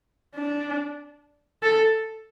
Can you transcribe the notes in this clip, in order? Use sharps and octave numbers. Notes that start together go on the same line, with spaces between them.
D4
A4